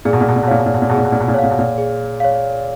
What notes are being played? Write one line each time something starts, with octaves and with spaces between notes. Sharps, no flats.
A#2 G#4
B2
A#2
B2
A#2
B2
A#2 C#5 F5
B2
A#2
B2
A#2
B2 G#4
A#2
B2
A#2
B2
A#2
A#2 B2 C#5 F5
B2
A#2
G#4
C#5 F5